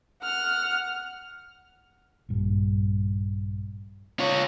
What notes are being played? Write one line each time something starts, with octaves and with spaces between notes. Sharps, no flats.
F#5 F6
A#1 G2
F4 C#5